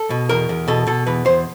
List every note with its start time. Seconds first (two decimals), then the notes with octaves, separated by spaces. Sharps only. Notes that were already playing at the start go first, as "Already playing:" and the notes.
Already playing: A4
0.10 B2
0.29 E2 A#4
0.49 E2
0.68 B2 A4
0.87 B2 A4
1.07 E2 B4
1.25 E2 C5